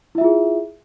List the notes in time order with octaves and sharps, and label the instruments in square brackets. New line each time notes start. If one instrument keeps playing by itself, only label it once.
[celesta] E4
E5
F4
G#4